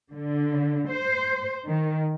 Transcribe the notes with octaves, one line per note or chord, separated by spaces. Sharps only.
D3
C5
D#3